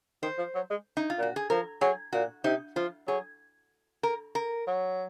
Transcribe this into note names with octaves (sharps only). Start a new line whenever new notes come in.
D#3 C5
F3
F#3
G#3
D#4
F4
A#2 F#4
G#4
F3 A#4
F#3 G#4
A#2 F#4
C3 D#4
F3 F4
F#3 G#4
A#4
A#4
F#3